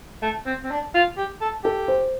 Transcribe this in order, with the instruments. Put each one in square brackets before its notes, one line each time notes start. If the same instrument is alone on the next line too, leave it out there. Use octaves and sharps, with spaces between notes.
[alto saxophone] A3
C4
C4
D4
F4
G4
A4
[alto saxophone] G4 [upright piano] A4
[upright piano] C5